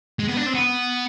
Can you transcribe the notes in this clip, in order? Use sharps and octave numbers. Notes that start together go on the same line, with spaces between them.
G#3
B3
D4
C4
B3